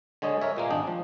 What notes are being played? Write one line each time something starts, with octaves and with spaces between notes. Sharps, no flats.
D3 G#3 C#5 D#5
A#4 C#5 E5
A#2 G#3 A#3
G#1 D4 D#5 G5
F3